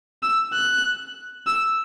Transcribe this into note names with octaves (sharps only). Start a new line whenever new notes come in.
E6
F#6
E6